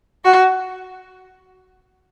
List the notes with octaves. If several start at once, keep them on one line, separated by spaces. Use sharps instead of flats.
F#4